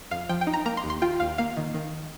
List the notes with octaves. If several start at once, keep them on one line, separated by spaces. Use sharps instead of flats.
F2 F5
F3 G5
G5
D#4
A#5
A#3 A#5
C6
D#2
C6
F4 G5
D#2 F5
A#3 F5
D#3
D#3